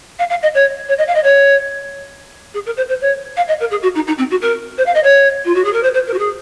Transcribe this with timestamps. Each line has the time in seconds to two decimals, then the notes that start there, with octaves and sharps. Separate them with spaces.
0.19 F5
0.30 F5
0.43 D#5
0.55 C#5
0.89 C#5
0.98 D#5
1.08 F5
1.15 D#5
1.24 C#5
2.54 G#4
2.66 A#4
2.77 C5
2.89 C5
3.01 C#5
3.37 F5
3.48 D#5
3.60 A#4
3.71 G#4
3.83 F#4
3.95 D#4
4.07 D#4
4.18 C4
4.31 F#4
4.42 A#4
4.78 C5
4.86 F5
4.95 D#5
5.04 C#5
5.45 F4
5.55 F#4
5.65 G#4
5.73 A#4
5.83 C5
5.94 C5
6.07 A#4
6.14 F#4
6.19 G#4